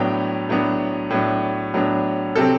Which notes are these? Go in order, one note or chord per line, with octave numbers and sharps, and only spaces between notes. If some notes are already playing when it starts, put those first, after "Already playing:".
Already playing: A2 F#3 B3 D4 G5
A2 F#3 B3 D4
A2 F#3 B3 D4
A2 F#3 B3 D4
C3 F#3 C4 A4